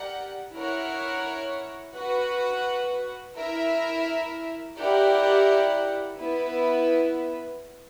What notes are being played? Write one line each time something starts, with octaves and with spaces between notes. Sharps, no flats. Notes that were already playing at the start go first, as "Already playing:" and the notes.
Already playing: G4 A#4 D5 F#5
E4 A#4 C#5 F#5
F#4 B4 F#5
E4 A#4 E5
E4 G4 A#4 D5 F#5
B3 E4 B4